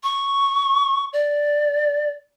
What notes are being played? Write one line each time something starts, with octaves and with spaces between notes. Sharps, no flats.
C#6
D5